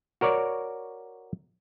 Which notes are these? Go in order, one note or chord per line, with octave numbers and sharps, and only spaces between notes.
F#4 A#4 C#5 D5